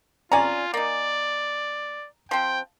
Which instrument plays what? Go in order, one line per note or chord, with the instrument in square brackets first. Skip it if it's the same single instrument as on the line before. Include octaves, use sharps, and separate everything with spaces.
[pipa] C#4 D5 [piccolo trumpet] F4 [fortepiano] G#5 A#5
[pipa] A#3 D#4 [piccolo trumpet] D5
[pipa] F3 C4 [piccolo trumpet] G5